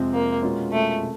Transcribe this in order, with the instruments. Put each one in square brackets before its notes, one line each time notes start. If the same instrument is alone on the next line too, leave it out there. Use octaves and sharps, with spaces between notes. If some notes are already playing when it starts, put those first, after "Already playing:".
Already playing: [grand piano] F2 C3 F3 G#3 C4
[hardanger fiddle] A#3
[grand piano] B2 G#3 C#4 F4
[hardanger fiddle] A3
[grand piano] C3